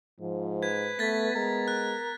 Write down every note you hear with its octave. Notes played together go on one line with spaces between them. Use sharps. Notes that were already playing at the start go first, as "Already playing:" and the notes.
G#2 F3
B4 G#6
A3 B3 A6 B6
G#3 A#4
F#6